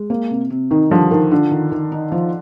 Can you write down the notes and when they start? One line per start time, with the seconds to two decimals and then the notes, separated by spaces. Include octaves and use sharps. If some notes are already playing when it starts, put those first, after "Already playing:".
Already playing: G#3
0.10 A#3
0.30 C3
0.50 C3
0.71 D#3 D#4
0.90 D3 F3 G3
1.11 D#3 A#4
1.31 D3 F4
1.51 D#3
1.72 D#3
1.92 D#4
2.12 F3